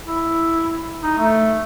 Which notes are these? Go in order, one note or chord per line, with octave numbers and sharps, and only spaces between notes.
E4
D#4
A3